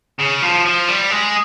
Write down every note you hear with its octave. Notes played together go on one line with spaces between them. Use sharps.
C#3
F3
F3
G3
G#3